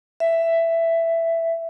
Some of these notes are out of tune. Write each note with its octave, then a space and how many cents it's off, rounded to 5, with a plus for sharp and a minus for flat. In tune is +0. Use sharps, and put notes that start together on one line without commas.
E5 +10